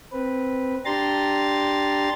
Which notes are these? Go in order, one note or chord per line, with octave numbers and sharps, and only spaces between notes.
C4 B4
D4 G4 A#5 C6 A6